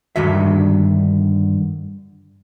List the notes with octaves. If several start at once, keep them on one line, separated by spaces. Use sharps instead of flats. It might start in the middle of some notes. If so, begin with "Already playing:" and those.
G2 D3 D#3 F#4 E5